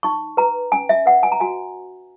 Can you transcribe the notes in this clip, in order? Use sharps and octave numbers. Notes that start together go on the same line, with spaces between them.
D#4 C#6
B4 A#5
C#4 G#5
E5
B4 F#5
G#5
A#5
F#4 G#5